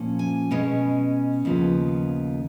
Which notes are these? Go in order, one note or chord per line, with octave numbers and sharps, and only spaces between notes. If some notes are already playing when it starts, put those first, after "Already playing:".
Already playing: A#2 F3 A#3 C#4
G#5
B2 G#3 C#4
D#2 C#3 F3 B3